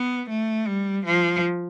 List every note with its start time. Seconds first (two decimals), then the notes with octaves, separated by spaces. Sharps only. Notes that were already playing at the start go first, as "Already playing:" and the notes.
Already playing: B3
0.30 A3
0.68 G3
1.06 F3